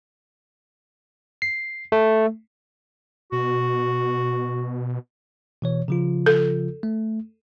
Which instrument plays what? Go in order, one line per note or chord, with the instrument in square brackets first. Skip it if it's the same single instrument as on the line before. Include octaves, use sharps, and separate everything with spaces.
[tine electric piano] C7
A3
[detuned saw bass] B2 [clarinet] F#4
[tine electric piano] B2 E3 C#5
C#3 F3 F4
[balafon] A4
[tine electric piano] A3